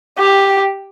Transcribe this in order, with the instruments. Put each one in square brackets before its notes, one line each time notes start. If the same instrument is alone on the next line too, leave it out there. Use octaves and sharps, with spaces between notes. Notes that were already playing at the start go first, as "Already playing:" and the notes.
[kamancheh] G4